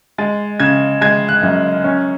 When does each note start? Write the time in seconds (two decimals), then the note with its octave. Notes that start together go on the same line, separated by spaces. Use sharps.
0.18 G#3 A6
0.60 C#3 G#6
1.01 G#3 G#6
1.29 F#6
1.43 F#2
1.84 C#4